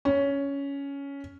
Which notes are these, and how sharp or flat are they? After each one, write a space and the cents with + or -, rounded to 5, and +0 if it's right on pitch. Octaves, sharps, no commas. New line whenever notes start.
C#4 +10